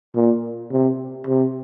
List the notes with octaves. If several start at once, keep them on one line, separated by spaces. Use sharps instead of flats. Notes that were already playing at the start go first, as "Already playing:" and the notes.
A#2
C3
C3